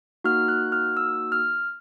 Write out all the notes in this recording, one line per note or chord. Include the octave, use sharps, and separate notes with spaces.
A#3 D#4 F#4 F6
F#6
F6
E6
F6